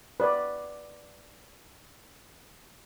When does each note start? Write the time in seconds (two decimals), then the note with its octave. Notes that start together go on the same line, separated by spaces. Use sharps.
0.20 B4 D5